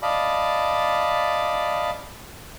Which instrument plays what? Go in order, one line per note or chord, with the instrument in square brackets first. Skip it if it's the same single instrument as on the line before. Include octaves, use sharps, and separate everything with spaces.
[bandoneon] D5 D#5 F5 A5 B5 D6